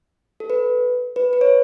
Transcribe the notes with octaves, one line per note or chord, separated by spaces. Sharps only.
A4
B4
B4
B4
C#5